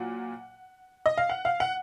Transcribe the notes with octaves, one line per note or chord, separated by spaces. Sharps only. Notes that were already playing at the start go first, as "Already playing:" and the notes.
Already playing: A#2 F#3 F#5
D#5
F5
F#5
F5
F#5